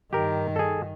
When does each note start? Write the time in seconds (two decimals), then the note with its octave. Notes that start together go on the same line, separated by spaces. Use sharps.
0.13 G2 D#3 G4 A#4
0.56 G#4 A4